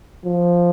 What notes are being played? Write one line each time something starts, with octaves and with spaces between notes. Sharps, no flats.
F3